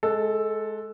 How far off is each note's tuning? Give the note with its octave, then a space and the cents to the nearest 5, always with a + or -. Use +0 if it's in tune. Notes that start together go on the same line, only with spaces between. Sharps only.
G#3 +25 A4 +0